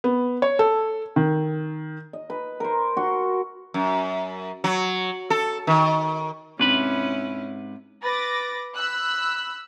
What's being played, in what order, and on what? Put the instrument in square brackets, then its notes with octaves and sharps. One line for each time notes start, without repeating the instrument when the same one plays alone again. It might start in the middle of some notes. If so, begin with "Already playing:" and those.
[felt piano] B3
C#5
A4
D#3
[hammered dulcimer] D#5
B4
A#4 C5
F#4 C6 C#6
[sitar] F#2
F#3
A4
D#3
[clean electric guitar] G#2 B4 B5 [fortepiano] C3 [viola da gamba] C#4 E4
[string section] B4 D6 A6 A#6
B5 E6 F#6